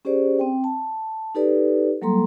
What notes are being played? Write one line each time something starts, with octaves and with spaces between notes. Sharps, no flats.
C#4 G4 G#4 C5 D5
C4 G5
A5
D#4 G4 A4 B4 D5
F#3 G3 A#3 A4 A#5 C6